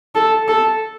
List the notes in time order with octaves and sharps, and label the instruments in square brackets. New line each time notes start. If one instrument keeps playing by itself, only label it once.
[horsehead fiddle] A4
A4